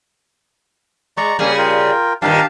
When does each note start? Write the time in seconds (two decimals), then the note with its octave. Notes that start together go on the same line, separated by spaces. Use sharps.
1.17 G#3 D5 A#5 C#6
1.39 C#3 G3 A#3 C#4 G#4
1.58 F4 A#4 G5
2.22 G2 A#2 D#3 G4 F5 A5